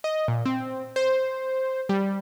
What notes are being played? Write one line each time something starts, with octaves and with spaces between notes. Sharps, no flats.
D#5
A#2
C4
C5
G3